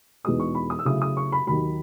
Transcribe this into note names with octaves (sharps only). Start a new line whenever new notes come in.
E2 B2 G#3 D#4 D#6
C#6
B5
D#6
E6
C#3 F#3 A3 E4 D#6
D#6
C#6
B5
D#2 D#3 F#3 B5